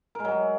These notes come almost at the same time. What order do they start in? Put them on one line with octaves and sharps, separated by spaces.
A#4 G#3 F#3